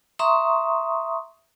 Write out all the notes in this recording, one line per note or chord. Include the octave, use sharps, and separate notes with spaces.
E5 A#5 C6 C#6 D#6